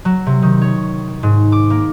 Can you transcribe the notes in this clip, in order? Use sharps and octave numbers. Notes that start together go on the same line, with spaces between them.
F#3
C3
D#3
C#5
G#2
D6
A#3